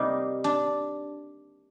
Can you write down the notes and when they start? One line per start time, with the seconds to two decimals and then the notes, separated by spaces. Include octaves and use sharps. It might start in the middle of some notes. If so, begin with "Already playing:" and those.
Already playing: C3 G3 A#3 D#4
0.44 D4